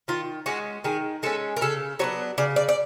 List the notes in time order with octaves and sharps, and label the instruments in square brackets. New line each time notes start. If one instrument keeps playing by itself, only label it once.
[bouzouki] D#3 F4
G#3 C#4 F#4
D#3 G#4
G#3 C#4 A4
A#4
C#3 A4
F#3 B3 D4 C#5
C#3 D5
D5
D5